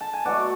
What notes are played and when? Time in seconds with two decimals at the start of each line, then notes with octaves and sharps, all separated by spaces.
0.01 A5
0.13 G#5
0.25 B2 F#3 A3 D5 F#5